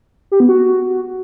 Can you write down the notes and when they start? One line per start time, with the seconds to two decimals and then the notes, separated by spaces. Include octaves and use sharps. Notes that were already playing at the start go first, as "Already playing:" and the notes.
0.32 G4
0.40 B3
0.49 F#4